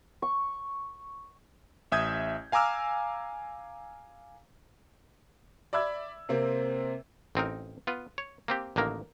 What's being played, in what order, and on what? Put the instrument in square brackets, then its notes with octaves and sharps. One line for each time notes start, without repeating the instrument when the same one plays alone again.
[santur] C#6
[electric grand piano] A1 E5 D#6 G6 G#6
F5 G#5 A#5 D6 E6 F6
[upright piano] D5 E5 B5 E6 G#6
C3 A#3 C4
[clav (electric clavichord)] A1 C4 D#4 A#4
B3 F4 B4
C#5
A#3 C4 G4
A1 D3 D#3 A#3 A#4